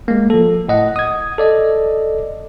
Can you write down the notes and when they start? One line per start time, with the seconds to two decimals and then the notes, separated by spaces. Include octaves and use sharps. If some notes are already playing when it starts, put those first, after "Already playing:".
0.08 G#3 A#3
0.30 F3 A4
0.69 A2 D#5 F#5
0.96 D#6 G#6
1.38 A4 D5 D#5